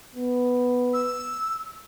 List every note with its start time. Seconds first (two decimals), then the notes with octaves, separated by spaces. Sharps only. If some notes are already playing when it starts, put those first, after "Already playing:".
0.16 B3
0.93 E6